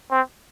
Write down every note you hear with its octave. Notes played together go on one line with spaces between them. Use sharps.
C4